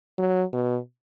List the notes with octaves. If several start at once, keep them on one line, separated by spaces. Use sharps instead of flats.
F#3
B2